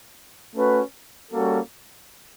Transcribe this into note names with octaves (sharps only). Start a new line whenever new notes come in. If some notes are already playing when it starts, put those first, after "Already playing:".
A3 C#4 F#4 B4
G3 A#3 C#4 F#4 A4